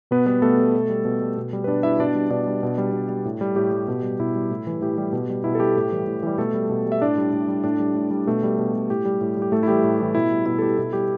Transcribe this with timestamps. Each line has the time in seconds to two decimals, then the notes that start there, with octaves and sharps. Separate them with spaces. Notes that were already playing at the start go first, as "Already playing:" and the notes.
0.11 B2 B3 B4
0.26 G3 B3 B4
0.42 B2 A3 A4
0.58 G3
0.74 B2
0.90 G3
1.05 B2
1.22 G3
1.37 B2
1.53 G3
1.64 B4
1.68 B2 D4 D5
1.83 G3 E4 E5
1.99 B2 D4 D5
2.15 G3
2.30 B2 D4 D5
2.47 G3
2.63 B2
2.78 G3
2.93 B2
3.09 G3
3.25 A2
3.41 G3
3.56 A2 G4
3.72 G3
3.88 B2
4.03 G3
4.20 B2 E4
4.35 G3
4.51 A2
4.67 E3 G3
4.82 A2 G4
4.97 E3 G3
5.13 B2
5.29 G3
5.44 B2 E4
5.55 A4
5.60 G3 G4
5.76 A2
5.92 E3 G3
6.07 A2
6.23 E3 G3
6.38 B2 A3 A4
6.54 G3
6.69 B2
6.86 G3
6.92 E5
7.02 A2 D4 D5
7.18 G3
7.33 A2
7.48 G3
7.64 A2 D4 D5
7.80 G3
7.95 A2
8.11 G3
8.27 B2 A3 A4
8.43 G3
8.59 B2
8.74 G3
8.89 A2 G4
9.05 G3
9.21 A2
9.37 G3 G4
9.52 A2 A3 A4
9.63 E4
9.68 E3 G3 G4
9.84 A2
10.00 E3 G3
10.15 B2 E4
10.31 G3
10.46 B2 E4
10.59 A4
10.62 G3 G4
10.78 B2 E4
10.93 G3 G4